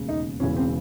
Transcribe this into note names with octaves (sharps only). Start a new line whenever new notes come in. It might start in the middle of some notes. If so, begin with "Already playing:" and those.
Already playing: E1 D#2 C#3
D#4
E1 E2 C#3 E3 C#4
C4